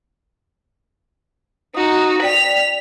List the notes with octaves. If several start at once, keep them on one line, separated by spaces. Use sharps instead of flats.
D#4 F#4 D#6
D5 G5 B6 F7